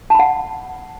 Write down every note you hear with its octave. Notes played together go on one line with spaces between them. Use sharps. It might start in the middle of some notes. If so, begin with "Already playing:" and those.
F#5 A5 B5